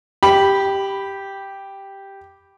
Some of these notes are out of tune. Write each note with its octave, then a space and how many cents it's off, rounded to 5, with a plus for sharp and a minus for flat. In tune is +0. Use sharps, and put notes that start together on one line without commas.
G4 +0 B5 +0